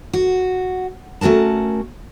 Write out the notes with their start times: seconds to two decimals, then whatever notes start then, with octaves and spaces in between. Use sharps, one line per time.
0.13 F#4
1.21 A3 C#4 F#4 A#4 A5